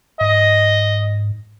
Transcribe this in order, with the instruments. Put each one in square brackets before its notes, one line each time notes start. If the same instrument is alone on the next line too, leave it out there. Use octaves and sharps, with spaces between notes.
[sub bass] G#2 [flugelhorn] D#5